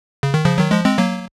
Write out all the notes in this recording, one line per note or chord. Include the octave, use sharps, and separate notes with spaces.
C#3
D#3
C#3 F3
D#3 F#3
F3 G#3
G#3 C4
F#3 A#3